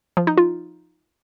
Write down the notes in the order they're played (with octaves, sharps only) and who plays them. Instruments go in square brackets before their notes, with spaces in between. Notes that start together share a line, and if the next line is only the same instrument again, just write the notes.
[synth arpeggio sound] F3
D#4
F4